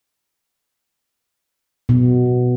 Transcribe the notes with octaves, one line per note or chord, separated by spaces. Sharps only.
B2